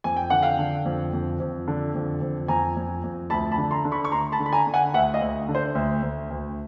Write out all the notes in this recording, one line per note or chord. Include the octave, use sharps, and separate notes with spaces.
F2 G#5
G5
D3 F#5
F5 G5
D3
F2
F2
F2
D3
F2
F2
F2 G#5 A#5
F2
F2
D2 A5 B5
A5 B5
D3
A#5 C6
D3
B5 C#6
C#6
D2 A#5 C6
A5 B5
D3
B5
G#5 A#5
D3
F#5 G#5
D2 E5 F#5
D#5 F5
D2
D3
C5
D2 C5
D2
D2